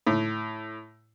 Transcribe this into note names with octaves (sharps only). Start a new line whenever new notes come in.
A2